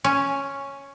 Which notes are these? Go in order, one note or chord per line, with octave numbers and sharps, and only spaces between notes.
C#4